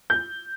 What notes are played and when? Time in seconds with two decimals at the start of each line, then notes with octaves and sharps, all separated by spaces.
0.10 G6